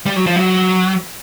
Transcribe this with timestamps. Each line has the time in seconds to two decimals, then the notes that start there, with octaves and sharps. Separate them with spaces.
0.06 G3
0.16 F#3
0.26 F3
0.36 F#3